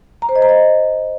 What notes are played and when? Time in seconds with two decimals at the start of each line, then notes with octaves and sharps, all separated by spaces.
0.22 A#5
0.29 C5
0.36 D#5
0.42 A#5
0.49 D#5